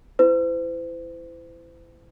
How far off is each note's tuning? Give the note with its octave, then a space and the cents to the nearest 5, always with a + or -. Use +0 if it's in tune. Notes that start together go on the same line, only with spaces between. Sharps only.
E4 +20 C5 -40